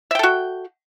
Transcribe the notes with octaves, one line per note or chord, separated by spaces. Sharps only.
F#4 A4 E5 G5